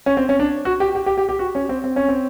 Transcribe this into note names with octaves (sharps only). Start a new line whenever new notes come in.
C#4
C4
C#4
D4
F#4
G4
G4
G4
G4
G4
F#4
C#4
C4
C4
C#4
C4